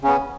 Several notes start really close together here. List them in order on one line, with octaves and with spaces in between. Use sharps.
C#3 C#4 B3